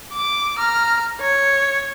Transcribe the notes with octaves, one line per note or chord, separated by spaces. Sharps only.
D6
A#5 F6
C#5